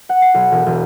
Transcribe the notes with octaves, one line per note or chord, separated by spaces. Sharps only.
F#5
C7
B1
E1
E1